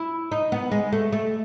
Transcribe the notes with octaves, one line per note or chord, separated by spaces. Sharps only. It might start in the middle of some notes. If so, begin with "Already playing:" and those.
Already playing: E4
D#4
B3
G#3
A3
A3